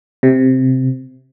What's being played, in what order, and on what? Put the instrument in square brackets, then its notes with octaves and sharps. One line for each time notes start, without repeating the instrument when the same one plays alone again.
[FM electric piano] C3